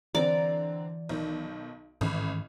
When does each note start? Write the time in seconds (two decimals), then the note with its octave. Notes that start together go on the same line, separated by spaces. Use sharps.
0.15 D3 E3 C4 D5 A#5
1.09 B1 D#3
2.01 A1 G#2 D#3 E3 B5